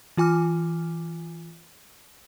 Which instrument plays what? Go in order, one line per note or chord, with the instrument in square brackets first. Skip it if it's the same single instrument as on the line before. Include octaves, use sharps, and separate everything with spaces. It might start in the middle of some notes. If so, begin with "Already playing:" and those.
[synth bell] E3 F4 G#5 D6 F6